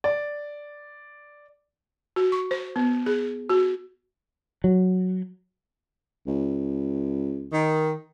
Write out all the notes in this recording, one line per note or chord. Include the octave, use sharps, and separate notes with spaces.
D5
F#4
C#6
C5
B3
G#4
F#4
F#3
C#2
D#3